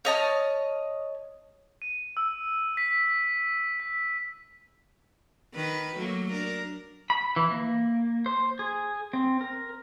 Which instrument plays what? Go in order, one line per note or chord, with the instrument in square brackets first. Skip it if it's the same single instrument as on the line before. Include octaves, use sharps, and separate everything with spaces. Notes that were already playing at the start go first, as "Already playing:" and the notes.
[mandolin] C#5 D#5 A5 F6
[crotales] D#7
E6
B6
B6
[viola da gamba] D#3 B4
F#3 A3 A#3
D4 A#4
[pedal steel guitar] B5
E3
A#3
C5
G#4
C4
A#4